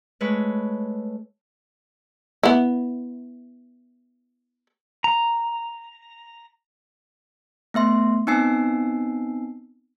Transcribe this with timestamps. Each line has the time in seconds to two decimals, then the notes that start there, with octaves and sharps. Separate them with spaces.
0.20 G#3 A3 B4 C#5
2.43 B3 E4
5.04 A#5
7.74 A3 B3 E5 C6
8.27 B3 C4 D#4 G#5 E6 C7